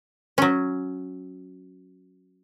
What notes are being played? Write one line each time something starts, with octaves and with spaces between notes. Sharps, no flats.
F#3 C#4